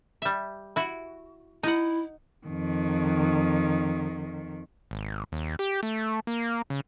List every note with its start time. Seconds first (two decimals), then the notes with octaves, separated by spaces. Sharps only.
0.22 G3 E5
0.76 E4 F#4
1.63 D#4 E4 F#5
2.47 F2 D#3
4.91 G#1
5.32 D#2
5.59 G4
5.83 A3
6.27 A#3
6.70 C#3